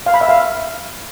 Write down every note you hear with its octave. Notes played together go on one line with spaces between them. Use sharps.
F5
B5
E5
F5